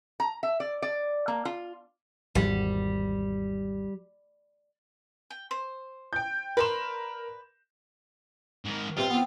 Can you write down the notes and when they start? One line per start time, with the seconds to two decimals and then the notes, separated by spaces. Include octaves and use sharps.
0.20 A#5
0.43 E5
0.60 D5
0.82 D5
1.28 A#3
1.45 F4
2.35 G#1 E2 G3
5.30 G5
5.51 C5
6.13 G5 G6
6.57 A#4 B4 D5 C6 E7
8.65 G#2 D#3
8.97 G2 C3 F4 C5
9.10 B3 C4